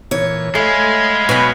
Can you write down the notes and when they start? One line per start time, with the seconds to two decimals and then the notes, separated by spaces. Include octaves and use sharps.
0.11 A#2 E3 C#5
0.55 G#3 A3 F5 G#5 B5
1.29 B2 F#3 B4